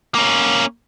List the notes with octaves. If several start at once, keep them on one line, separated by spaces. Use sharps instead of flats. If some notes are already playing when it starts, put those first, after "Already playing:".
A#3 C#4